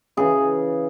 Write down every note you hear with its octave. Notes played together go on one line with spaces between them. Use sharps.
C#3 E3 G#4